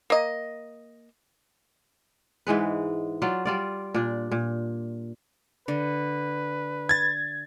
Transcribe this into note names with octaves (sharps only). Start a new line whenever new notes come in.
A#3 D#5
G#2 E3 G#3 B4
F#3 F4 D5
G3 F4 D5
A#2 D4
A#2
D3 B4
G#6 A6